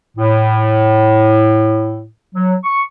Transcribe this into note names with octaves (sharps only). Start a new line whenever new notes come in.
A2
F#3
C#6